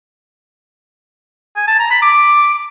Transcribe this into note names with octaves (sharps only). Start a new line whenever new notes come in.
G#5
A5
A#5
B5
D6